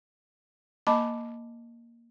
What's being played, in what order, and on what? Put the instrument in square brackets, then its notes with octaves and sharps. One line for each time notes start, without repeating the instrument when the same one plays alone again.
[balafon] A#3 D#5 A5 B5 D6